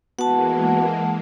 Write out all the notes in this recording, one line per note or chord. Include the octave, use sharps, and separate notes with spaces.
E3 G#3 A#3 B3 F#4 F#5 A5